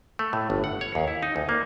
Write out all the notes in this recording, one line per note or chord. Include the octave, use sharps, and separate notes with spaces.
A3
A2
G1
F#5
C#5
D#2
E4
D#4
D2
A#3